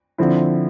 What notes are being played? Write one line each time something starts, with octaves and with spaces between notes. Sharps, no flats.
D3 F3 C4 E4